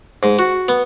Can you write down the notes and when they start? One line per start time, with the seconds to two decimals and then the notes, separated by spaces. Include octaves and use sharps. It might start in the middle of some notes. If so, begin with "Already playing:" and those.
0.23 G#2
0.39 F#4
0.68 B3